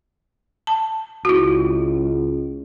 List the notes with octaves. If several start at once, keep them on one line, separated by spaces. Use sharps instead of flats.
A5
C#2 E4 F#4